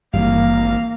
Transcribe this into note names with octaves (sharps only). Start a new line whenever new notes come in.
G#1 G2 E3 G3 A#3 F5